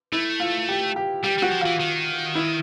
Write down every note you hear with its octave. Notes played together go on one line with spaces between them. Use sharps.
A3 E4
F4
G4
G4
G3 G4
G3 F#4
F3
E3 F4
D#3
E4